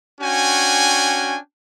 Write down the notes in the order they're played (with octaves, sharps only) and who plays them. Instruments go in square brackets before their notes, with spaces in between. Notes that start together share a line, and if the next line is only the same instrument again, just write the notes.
[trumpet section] C#4 D4 F#4 G5 G#5